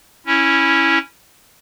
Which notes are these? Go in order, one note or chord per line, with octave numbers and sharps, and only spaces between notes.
C#4 E4